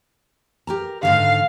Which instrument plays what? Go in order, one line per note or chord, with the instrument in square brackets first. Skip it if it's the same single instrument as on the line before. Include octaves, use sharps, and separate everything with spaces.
[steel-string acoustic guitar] G4 A#4 A#5
[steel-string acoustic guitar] G#2 D3 D#3 [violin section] F5